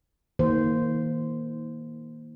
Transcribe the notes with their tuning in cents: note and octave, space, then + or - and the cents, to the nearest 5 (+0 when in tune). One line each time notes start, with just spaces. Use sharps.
D#3 +30 A#3 +0 C5 -10